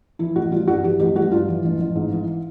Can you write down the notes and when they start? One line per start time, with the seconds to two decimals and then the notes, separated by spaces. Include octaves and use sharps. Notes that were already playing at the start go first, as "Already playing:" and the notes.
0.19 E3 E4
0.36 A1 F#4
0.52 G3 F4
0.68 G2 F#4
0.84 E3 G4
1.00 A1 G4
1.16 G3 F#4
1.32 G2 F4
1.48 E3
1.64 A1
1.80 A1
1.96 G#2
2.12 E3